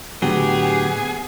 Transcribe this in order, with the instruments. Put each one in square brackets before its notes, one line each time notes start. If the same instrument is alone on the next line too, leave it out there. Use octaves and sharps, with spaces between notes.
[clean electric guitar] A2 D3 F#3 [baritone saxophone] B3 [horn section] G4 [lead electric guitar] G#4